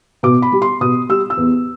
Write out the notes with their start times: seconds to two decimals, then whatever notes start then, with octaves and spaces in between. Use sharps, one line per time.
0.23 B2 D6
0.42 B5
0.52 G3
0.62 C6
0.81 B2 D#6
1.09 G3 E6
1.30 E6
1.37 E2